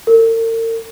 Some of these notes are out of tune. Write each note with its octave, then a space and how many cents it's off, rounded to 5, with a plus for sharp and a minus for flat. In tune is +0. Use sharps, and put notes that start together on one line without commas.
A#4 -45